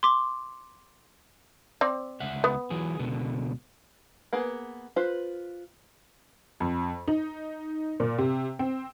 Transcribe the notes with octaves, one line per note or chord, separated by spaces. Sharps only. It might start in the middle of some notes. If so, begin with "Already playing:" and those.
C6 D6
C4 D5
C#2 E5 F#5
B3
E3 F#3 G#4
C#2 B2 D3
A#3 B3 G#4 B4
F4 B4 C5
F2
D#4
A#2
C3
C4